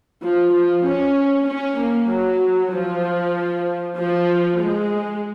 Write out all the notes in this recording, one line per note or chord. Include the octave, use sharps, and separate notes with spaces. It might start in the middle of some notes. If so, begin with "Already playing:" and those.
F3
F3
C#4
C#4
A#3
F#3
F3
F3
G#3